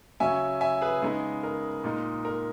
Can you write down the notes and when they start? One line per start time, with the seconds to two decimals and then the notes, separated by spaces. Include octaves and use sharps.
0.20 C#3 F#3 C#4 E5 G#5
0.61 E5 G#5
0.81 G#4 B4
1.02 C#3 G#3 B3 D#4 G#4
1.43 A#4
1.84 A#2 G#3 D#4
2.25 A#4